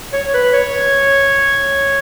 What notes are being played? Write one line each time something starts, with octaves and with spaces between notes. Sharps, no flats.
C#5
B4
C#5